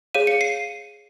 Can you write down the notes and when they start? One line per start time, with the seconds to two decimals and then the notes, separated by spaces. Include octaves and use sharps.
0.14 G#4 C#5 F5 D#7
0.27 C#7
0.41 C7 D#7